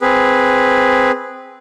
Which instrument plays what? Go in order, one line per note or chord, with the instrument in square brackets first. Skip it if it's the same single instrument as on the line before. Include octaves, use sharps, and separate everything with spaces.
[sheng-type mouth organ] C4 G#4 B4